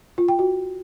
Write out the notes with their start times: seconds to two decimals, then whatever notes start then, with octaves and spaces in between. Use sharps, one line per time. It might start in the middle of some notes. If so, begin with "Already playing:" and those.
0.18 F4
0.28 G5
0.39 F#4